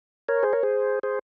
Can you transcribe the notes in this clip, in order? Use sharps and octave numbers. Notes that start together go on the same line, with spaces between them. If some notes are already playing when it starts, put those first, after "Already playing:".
A#4 C#5
G#4 C5
A#4 C#5
G#4 C5
G#4 C5